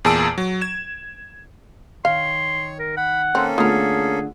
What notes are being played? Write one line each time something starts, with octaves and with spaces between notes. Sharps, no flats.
E2 A#2 G#4 A5 E6 D7
F#3
G#6 E7
D#3 C#5 F5 C6
A#4
F#5 B5
A#3 C4 C#4 A4
D3 A3 B3 F4 G#4 A#4